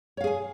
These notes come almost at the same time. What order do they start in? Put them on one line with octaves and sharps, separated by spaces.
C#5 F5 G#4 G#5